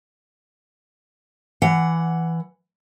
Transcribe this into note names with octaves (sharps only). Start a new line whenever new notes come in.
E3 F#5